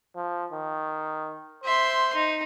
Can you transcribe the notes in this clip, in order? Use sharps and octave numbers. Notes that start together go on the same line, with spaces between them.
F3
D#3
C5 E5 C6
D#4